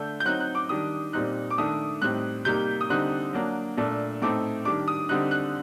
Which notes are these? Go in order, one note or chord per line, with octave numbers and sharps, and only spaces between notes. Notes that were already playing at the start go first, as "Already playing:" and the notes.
Already playing: D3 A3 D4 G6
G6
F#3 C4 D#4 F#6
F#6
D6
D#3 G3 D4 D#6
A#2 G3 C4 D#4 F#6
D6
D#3 A3 D4 D#6
A2 G3 C4 D#4 F#6
C3 G3 A#3 D#4 G6
D#6
D3 G3 C4 D#4 F#6
F#3 A#3 D4
A#2 A3 D4
A2 A3 C4 D#4 D6
D#3 G3 D4 D6
D#6
D3 G3 C4 D#4 F#6
F#6